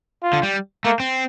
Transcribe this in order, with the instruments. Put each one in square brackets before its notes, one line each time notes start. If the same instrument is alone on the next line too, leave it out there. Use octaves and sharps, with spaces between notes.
[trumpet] F4
[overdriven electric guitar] D3
G3
[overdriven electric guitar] A3 [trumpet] A#3
[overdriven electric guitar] C4